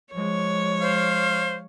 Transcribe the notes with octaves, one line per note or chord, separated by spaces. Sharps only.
F3 G#3 C#5
C5 F5